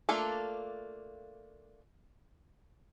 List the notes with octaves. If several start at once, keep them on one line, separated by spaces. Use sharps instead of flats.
A3 A#3 D4 F4 A4